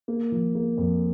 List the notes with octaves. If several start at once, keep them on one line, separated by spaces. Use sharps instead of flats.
A#3
F3
A#3
F2